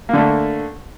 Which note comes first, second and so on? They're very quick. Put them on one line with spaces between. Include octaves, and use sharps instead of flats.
A#3 D3 A3